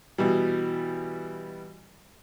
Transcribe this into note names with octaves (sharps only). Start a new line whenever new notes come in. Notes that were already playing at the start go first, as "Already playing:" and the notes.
B2 E3 G3